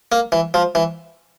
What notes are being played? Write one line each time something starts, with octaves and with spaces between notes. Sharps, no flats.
A#3
E3
F3
E3